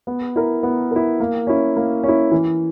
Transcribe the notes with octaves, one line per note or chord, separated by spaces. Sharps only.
B3
E4 A#4
B3
E4 A#4
A#3
C#4 E4
A#3
C#4 E4
E3